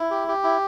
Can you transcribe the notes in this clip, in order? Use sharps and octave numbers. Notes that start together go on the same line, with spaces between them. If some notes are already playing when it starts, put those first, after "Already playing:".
Already playing: E4
G4
G4
E4